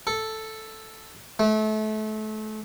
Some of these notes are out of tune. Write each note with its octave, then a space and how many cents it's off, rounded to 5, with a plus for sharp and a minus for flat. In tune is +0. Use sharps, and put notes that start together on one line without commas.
A4 +0
A3 -30